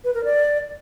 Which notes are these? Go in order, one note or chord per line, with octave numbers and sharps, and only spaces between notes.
B4
A#4
D5